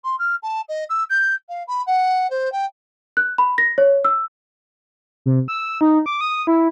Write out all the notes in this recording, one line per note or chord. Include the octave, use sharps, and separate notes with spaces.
C6
F6
A5
D#5
E6
G6
F5
B5
F#5
C5
G5
F#6
B5
A#6
C#5
E6
C3
E6
D#4
D6
D#6
E4